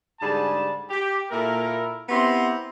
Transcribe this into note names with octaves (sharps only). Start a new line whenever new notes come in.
G#2 D3 G3 G#4 A5
G4
A#2 A#3 E4 A4 A#4
B3 C4 E4 G4 A#5 C6